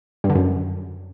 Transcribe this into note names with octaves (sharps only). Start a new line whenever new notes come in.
G2
D3
F#2